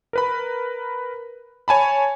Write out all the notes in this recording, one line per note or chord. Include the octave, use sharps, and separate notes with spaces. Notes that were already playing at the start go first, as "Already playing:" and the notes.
A#4 B4 B5
C#5 G#5 A5 B5